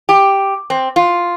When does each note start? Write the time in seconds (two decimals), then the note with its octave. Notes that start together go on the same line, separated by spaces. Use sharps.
0.09 G4
0.70 C4
0.96 F4